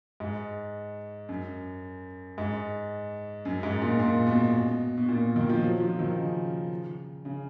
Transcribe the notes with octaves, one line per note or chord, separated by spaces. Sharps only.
G#2
F#2
G#2
F#2
G#2
A#2
A#2
B2
B2
A#2
D#3
F3
F#3
F3
D#3
C#3
C#3